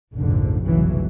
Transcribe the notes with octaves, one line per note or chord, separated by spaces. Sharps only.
F1 A#1 G#2 D3 F3
F1 B1 G2 C#3 E3 F#3